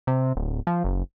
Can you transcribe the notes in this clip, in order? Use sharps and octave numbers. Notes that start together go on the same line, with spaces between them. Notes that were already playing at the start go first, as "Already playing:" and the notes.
C3
D1
F3
F#1